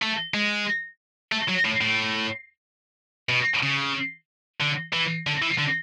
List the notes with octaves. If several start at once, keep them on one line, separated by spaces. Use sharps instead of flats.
A3
G#3
A3
F#3
A2
A2
B2
C#3
D3
E3
D3
E3
D3